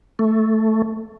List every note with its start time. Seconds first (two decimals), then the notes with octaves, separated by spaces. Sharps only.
0.19 A3